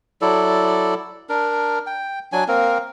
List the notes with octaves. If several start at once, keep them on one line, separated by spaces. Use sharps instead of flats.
F#3 E4 A4 D5
D4 A#4
G5
F#3 D4 G#5
A#3 C4 A#4